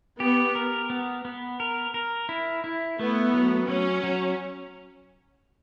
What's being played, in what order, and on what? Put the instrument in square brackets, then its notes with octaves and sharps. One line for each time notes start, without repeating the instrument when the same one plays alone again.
[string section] B3 [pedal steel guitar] G4
[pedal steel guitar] A#4
B3
B3
A#4
A#4
E4
E4
[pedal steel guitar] A3 [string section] B3
[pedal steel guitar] F#3
[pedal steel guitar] F#3 [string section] C#4
[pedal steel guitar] F#3